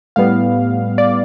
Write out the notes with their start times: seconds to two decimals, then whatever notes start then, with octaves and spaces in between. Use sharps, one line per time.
0.16 A2 G3 B3 F5
0.98 D5